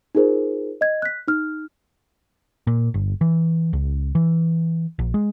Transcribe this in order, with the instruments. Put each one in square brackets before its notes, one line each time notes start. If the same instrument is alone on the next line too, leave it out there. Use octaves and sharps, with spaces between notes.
[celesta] D#4 F4 G#4 A#4 C5
D#5 G#6
F#6 B6
D#4 F6
[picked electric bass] A#2
G1
E3
C#2
E3
A#1
G#3